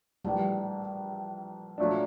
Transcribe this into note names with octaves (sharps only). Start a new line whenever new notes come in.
A#1 A2 E3 G3
A#2 F#3 A3 D4